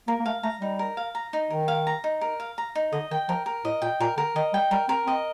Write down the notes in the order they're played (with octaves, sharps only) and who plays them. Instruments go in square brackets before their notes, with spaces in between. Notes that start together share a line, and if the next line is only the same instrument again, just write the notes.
[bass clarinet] A#3 [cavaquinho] A#4
[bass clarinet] A#3
[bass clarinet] A3 [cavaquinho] F5
[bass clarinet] A3 [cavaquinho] A#5
[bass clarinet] G3 [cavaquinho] D#4
[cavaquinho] A#4
F5
A#5
D#4
[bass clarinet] D#3 [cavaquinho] A#4
[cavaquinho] F5
A#5
D#4
A#4
F5
A#5
D#4
[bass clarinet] D3 [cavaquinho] D#5
[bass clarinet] D#3 [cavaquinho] G5
[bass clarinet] F3 [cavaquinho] A#4
[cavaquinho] A#4
[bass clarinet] A2 [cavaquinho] D#5
[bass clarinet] A#2 [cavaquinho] G5
[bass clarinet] A#2 [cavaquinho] A#4
[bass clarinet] D3 [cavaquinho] A#4
[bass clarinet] D#3 [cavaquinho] D#5
[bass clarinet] G3 [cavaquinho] G5
[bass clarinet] G3 [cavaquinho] A#4
[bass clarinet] C4 [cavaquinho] A#4
[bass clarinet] C4 [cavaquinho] D#5